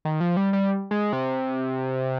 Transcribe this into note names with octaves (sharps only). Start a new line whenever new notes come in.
D#3
F3
G3
G3
G#3
C3